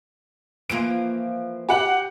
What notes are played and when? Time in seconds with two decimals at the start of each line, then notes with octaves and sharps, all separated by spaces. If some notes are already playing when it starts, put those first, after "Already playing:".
0.70 E3 F3 A#3 D7
1.69 G4 F#5 F#7